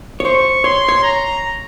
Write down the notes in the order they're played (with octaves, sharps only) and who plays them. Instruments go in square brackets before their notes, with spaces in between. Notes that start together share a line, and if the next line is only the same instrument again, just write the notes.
[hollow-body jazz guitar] C#5
[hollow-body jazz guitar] C5 [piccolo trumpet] C#6
[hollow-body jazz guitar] C#5 [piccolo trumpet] C6
[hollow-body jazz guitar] C#5
[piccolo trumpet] A#5